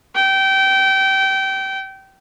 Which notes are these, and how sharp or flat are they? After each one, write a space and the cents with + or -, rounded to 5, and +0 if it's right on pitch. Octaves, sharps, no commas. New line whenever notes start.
G5 -25